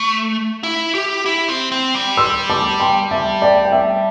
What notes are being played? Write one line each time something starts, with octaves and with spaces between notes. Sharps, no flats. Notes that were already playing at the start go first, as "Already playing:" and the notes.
Already playing: A3
E4
G4
E4
C4
C4
G3
C6 E6
A5 D6
G5 C6
E5 A5
D5 G5
G5
E5 A5